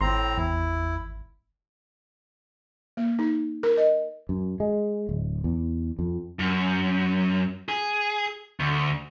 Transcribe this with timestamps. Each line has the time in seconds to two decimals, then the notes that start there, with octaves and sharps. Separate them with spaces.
0.01 G#1 A2 C4 A#5 C6
0.37 E2 E4
2.97 A#3
3.19 D#4
3.63 A#4
3.77 D#5
4.29 F#2
4.60 G#3
5.09 D1
5.44 E2
5.99 F2
6.39 F#2
7.69 G#4
8.60 D2